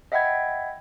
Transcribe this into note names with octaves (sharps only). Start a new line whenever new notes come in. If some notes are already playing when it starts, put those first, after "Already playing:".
D#5 E5 F#5 G5 B5 G#6